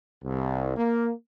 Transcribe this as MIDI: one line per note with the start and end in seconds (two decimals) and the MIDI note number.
0.23 0.76 36
0.76 1.10 58